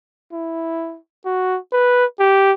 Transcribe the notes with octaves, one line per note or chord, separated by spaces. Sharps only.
E4
F#4
B4
G4